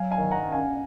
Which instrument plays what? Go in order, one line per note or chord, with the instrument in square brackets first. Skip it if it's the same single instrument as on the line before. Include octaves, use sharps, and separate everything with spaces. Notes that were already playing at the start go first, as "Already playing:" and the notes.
Already playing: [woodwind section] F#3 [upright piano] F5 G#5
[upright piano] F5 G#5
[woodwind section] D#3
[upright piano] F#5 A#5
[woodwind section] C#4
[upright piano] F5 G#5